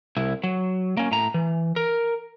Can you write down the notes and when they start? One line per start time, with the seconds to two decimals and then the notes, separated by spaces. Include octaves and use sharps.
0.17 C2 E4
0.44 F#3
0.97 A#3 C#4
1.12 A2 A#5
1.34 E3
1.76 A#4